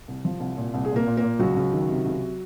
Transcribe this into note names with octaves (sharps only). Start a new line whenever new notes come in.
C2
F3
C2
A#2
C2
G#4
A#2
A#3 A#4
A#2
A#3 A#4
A#2
C#2 F#3 F#4
C#2
D#3
C3
C#2